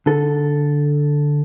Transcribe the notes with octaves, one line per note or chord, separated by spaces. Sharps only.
D3 A4